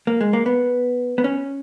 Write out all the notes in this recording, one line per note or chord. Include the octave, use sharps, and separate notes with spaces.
A#3
G#3
A#3
B3
B3
C#4